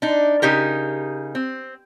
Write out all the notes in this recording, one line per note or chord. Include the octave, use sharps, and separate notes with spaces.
D4 D#4
C#3 D#4 G4 A#4
C4